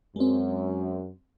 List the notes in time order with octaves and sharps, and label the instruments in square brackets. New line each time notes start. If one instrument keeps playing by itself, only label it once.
[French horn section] F#2 [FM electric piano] G#3 C4